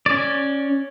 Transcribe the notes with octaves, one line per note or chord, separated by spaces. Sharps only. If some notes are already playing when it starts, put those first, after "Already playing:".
C#4 D5